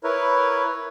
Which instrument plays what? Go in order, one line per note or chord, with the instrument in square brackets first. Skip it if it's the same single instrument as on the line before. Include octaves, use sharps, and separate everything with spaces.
[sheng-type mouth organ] E4 A#4 B4 C#5